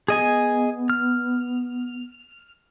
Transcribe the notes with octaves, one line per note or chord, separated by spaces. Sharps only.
B3 G#4 D#5 G#5
F6